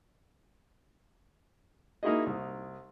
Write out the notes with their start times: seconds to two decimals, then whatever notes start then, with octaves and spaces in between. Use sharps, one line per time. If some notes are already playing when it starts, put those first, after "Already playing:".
2.03 A#3 D#4 E4 F#4 G#4 D#5
2.26 C2